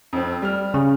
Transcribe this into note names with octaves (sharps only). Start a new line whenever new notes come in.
F2 C4
G3 F6
C#3